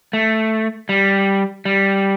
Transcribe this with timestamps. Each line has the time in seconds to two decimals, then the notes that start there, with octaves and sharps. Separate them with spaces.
0.13 A3
0.89 G3
1.65 G3